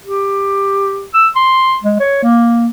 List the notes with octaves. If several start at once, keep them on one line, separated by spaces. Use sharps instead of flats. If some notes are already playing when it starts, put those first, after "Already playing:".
G4
E6
C6
G#3
C#5
A#3